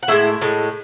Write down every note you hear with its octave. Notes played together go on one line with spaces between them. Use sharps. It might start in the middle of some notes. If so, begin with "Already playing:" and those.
F#5
A2 G#3 E4 E5
A2 G#3